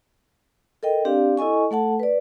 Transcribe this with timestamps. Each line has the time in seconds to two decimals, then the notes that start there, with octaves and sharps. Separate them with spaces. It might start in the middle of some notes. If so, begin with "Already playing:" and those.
0.83 A4 A#4 D#5 G5
1.05 C4 D4 G4 D5 F5
1.37 E4 A4 D#5 G#5 C#6
1.71 A3 A4 F#5 A5
2.00 B4 D5